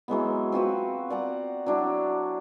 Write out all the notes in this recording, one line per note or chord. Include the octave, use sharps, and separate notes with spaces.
E3 F#3 G#3 B3
C4 F4 F#4 B4
D5 F#5 A#5
F#3 D4 E4